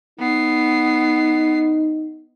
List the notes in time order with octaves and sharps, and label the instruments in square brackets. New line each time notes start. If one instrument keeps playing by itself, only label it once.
[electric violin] B3 C7 [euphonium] D#4